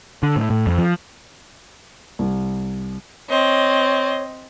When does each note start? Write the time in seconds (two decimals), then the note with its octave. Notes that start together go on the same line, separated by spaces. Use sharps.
0.23 D3
0.36 A2
0.50 A2
0.67 F2
0.78 F3
2.19 C2
3.29 C4 C#5 D#5